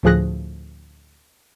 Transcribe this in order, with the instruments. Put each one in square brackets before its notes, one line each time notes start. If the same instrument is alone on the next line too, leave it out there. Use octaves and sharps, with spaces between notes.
[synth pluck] D2 A2 F3 G#4 F#6 A#6